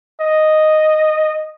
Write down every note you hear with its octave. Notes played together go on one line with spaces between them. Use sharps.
D#5